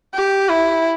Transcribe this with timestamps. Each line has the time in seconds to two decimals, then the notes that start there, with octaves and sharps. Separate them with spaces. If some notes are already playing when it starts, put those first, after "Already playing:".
0.14 G4
0.49 E4